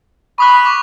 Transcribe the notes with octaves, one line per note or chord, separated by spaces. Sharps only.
B5 C#6 D#6 F#6
C#6 D6